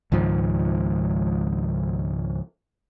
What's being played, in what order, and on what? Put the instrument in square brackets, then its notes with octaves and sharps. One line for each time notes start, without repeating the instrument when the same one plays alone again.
[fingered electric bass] C#2 G#2 D#3 F3